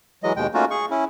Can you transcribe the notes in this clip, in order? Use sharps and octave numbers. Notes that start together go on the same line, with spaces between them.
E3 F#3 G#3 D#5
D#2 B2 G#3 G5
A3 A#3 C#4 D#4 F4 F#4
G#4 C#6
C#4 E4